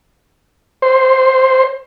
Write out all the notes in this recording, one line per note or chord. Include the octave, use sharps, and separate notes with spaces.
C5